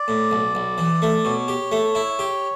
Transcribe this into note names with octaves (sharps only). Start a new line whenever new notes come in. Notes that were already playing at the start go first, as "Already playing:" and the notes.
Already playing: D5
A2
B1
B1
E3
A3
B2 C#5
G4
A3
E4
G4